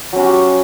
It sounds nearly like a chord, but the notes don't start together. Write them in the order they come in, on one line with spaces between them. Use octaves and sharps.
F#3 C#4 F#4 G4